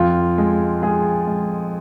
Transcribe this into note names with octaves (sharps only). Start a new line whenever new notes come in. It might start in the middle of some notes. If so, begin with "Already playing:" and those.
Already playing: F2 F4
G#3
G#3 G#4
G#3